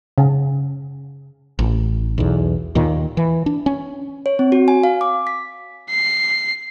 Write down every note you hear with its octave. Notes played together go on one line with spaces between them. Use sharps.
C#3
A1
B1 E2
D#2 A#2 D#3
E3
D4
C#4
C#5
C4
F#4
G#5
F5
D6
B6
C7